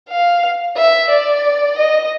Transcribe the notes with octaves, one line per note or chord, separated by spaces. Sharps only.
F5
E5
D5
D#5